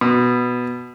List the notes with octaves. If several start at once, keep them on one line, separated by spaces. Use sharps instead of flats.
B2